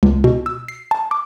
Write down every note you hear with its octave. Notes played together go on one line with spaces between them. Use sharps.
C#2
B2
E6
C7
A5
D6